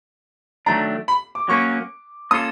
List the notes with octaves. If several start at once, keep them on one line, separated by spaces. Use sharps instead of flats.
D#3 F#3 A3 D4 A#5
B5
D6
F#3 A#3 C#4 C#6
A#3 C#4 F4 A4 D#6